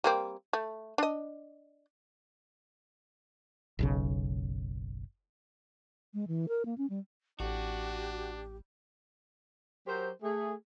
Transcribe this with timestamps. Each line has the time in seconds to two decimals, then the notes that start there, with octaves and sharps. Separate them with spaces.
0.04 G3 A#3 C4
0.53 A3
0.98 D4 D#5
3.79 F#1 B1 C#3
6.14 G#3
6.28 E3
6.49 A#4
6.65 A#3
6.78 C#4
6.90 G3
7.40 A1 D4 F#4 G4
9.86 F#3 G4 A#4 C5
10.23 A3 G#4